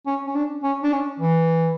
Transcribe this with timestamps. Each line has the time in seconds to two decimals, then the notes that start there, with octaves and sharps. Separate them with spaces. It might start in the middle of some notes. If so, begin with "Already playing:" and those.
0.06 C#4
0.27 C#4
0.35 D4
0.63 C#4
0.83 D4
0.93 C#4
1.20 E3